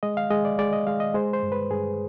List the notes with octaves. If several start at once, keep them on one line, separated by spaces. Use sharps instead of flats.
G#3 D#5
F5
G#3 D#5
D5
G#3 D5
D#5
G#3 F5
D#5
G#3 C5
C5
G2
B4
G2 G#4